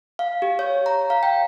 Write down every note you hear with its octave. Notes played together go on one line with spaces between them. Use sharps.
F5
G4
C#5
A#5
F5
G5